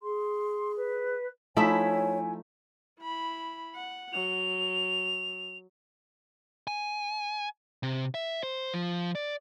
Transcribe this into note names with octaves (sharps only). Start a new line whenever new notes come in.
G#4 C6
B4
F3 A3 D#4 E4 C#5 E5 G#5
E4 B5
F#5
F#3 F7
G#5
C3
E5
C5
F3
D5